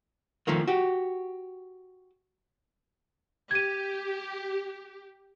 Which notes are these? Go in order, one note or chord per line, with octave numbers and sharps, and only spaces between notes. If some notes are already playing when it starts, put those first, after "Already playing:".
D#3 F3 A3 A#3
F#4 G4
G4 G#6 D#7